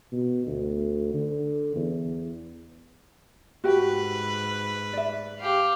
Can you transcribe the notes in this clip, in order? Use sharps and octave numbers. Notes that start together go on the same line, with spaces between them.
B2
D2
D3
E2
G#2 F#4 G4 B4 G5
D5 E5
G4 F5